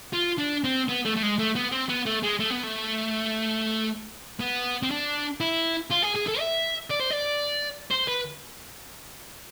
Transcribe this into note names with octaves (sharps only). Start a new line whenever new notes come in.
F4
D4
C4
B3
A3
A3
G#3
A3
B3
C4
B3
A3
G#3
A3
B3
A3
B3
C4
D4
E4
F4
G#4
G#4
A4
E5
D5
C5
D5
C5
B4